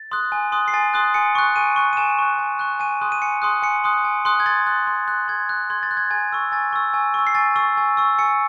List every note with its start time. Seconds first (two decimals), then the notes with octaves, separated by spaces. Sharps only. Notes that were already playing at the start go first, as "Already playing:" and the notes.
Already playing: A6
0.11 C6 D#6 F#6
0.32 G#5
0.52 C6 D#6 F#6
0.68 C7
0.74 G#5 A6
0.94 C6 D#6 F#6
1.14 G#5 C#7
1.35 C#6 F#6
1.56 G#5 D#7
1.76 C#6 F#6
1.93 D#7
1.97 G#5 E7
2.19 C#6 F#6
2.39 G#5
2.59 C#6 F#6
2.80 G#5 D#7
3.01 C6 D#6 F#6
3.12 D#7
3.22 G#5 C#7
3.42 C6 D#6 F#6
3.62 G#5 C#7
3.84 C6 D#6 F#6
4.05 G#5
4.25 C6 D#6 F#6
4.40 G#6
4.46 C6 A6
4.67 F#6
4.87 C6
5.08 F#6
5.28 C6 G#6
5.49 F#6
5.70 C6 G#6
5.83 A6
5.91 F#6
5.97 G#6
6.11 G#5 G#6
6.32 C#6 E6
6.52 G#5 A6
6.73 C#6 E6
6.94 G#5
7.14 C#6 E6
7.27 C7
7.35 G#5 A6
7.56 C#6 E6
7.77 G#5
7.97 C#6 E6
8.19 G#5 C#7